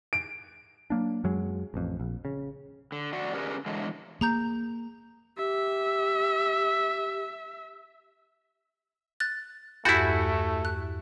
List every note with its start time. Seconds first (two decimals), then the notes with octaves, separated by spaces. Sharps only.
0.13 D7
0.90 F#3 A#3 D4
1.24 F#2 F#3 G#3
1.74 A1 F2
2.00 A#1
2.25 C#3
2.92 D3
3.13 F2 F#4 D5 F#5
3.34 D3 C#4 G4 G#4 A#4 B4
3.66 D3 E3 F#3 G#3 D4
4.21 A#3 G#4 A#5 G6
5.37 G4 E5
9.20 F#6 A6
9.85 E2 G2 A3 E4 F#4 B5 G6 A6
10.65 F#6